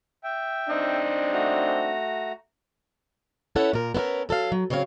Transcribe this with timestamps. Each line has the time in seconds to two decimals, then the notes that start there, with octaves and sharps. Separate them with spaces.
0.24 E5 G5
0.69 C4 D4 D#4
1.33 A3 F#4 A#5
3.56 C#4 E4 A4 B4 C#5 F#5
3.73 A#2 A#4
3.94 B3 C#4 E4 A4 A#4
4.29 F#3 A4 D#5 F5
4.52 F#3
4.70 C#3 F#3 C4 C#5 F5